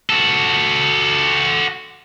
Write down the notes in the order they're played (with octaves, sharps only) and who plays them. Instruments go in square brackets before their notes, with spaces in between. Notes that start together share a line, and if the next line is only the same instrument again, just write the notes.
[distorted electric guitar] F#4 A4